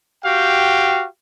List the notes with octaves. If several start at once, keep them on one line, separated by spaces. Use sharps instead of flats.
F#4 G4 F5 G5